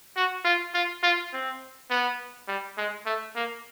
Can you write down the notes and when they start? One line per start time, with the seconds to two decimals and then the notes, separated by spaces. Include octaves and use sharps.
0.16 F#4
0.45 F4
0.74 F4
1.03 F4
1.33 C4
1.90 B3
2.48 G3
2.78 G#3
3.06 A3
3.35 A#3